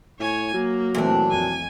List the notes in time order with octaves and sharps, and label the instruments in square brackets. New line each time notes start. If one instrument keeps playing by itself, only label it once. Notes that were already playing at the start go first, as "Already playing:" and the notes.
[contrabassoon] A2 [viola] C#5 G#5
[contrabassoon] F#3 [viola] A#3
[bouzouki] A#2 D4 [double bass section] E3 A3 C4
[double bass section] F2 [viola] G#5